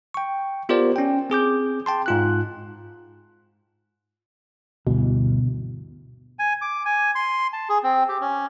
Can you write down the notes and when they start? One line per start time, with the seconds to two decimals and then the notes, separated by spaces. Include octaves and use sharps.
0.14 G5 C#6
0.69 B3 F4 G4 A#4 C5 D5
0.96 C#4 G5
1.30 C4 G#4 D6 G6
1.86 G5 A5 C6
2.06 G#2 F4 F#6
4.87 D2 G2 B2 E3
6.39 G#5
6.61 D6
6.85 G#5
7.15 C6
7.53 A5
7.69 G#4
7.83 C4
8.09 G4
8.21 C#4